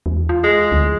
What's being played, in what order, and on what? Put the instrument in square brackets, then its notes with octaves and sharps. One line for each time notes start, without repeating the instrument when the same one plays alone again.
[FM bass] E2
F4
[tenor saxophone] G#3
[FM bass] D2